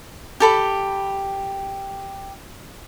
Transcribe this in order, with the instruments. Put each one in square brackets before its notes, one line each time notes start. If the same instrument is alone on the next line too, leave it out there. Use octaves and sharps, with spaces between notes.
[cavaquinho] G4 A4 B5